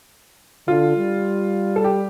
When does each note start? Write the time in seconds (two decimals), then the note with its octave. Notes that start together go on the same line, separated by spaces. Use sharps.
0.67 D3 F4
0.97 G3
1.76 A4
1.84 G4